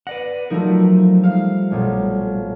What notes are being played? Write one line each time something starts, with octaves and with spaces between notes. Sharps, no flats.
B4 D5 F#5 A#6
F3 F#3 A3 D#4 A#4
G3 F5 C7
B1 A#2 A3